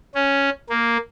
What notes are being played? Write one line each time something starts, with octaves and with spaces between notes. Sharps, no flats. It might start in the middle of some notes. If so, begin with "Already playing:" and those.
C#4
A#3